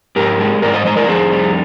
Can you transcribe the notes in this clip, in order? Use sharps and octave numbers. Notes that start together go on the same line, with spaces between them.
G#2 G4 A#4
G#3
G#2 A#4 D5
C5 D#5
G#3 C5 D#5
A#4 D5
F2 G#4 C5
G3